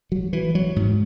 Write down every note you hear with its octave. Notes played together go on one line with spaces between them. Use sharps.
F#3
E3
F#3
G#2